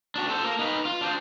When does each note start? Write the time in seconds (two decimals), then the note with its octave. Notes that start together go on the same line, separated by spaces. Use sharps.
0.16 D4 F#4
0.30 A4 C5
0.44 A#3 A#4
0.59 D#4 B4
0.85 F4
1.01 D4 C5